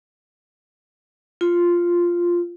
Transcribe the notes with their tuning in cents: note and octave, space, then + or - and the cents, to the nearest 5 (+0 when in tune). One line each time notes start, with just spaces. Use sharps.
F4 -5